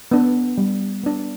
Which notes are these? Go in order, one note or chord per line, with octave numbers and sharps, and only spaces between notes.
B3 D4
G3
B3 D4